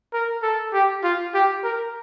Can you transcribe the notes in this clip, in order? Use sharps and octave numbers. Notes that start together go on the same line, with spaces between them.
A#4
A4
G4
F4
G4
A#4